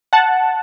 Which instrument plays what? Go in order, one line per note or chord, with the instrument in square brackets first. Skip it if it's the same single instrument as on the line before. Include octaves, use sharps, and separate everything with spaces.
[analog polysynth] F#5 A5